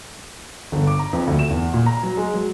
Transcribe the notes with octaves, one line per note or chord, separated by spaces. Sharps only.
G1
D6
A#5
F2
D2
E7
E2
A#2
A#5
F#3
G#3
F#3